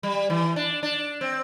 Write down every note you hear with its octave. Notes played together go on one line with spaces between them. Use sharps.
G3
E3
D4
D4
C4